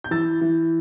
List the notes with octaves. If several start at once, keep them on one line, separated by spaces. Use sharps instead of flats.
G6
E3 E6 A6
E3